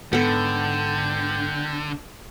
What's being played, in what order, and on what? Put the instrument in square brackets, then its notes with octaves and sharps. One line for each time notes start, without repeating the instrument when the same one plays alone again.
[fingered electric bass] G#2 [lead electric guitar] D3 [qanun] B3 A4 [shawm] G5